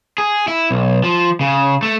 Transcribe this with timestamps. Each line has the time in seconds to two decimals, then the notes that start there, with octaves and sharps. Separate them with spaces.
0.18 G#4
0.48 E4
0.71 B1
1.04 F3
1.41 C#3
1.83 A3